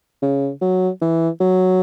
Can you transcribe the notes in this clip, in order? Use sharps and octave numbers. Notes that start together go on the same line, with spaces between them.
C#3
F#3
E3
F#3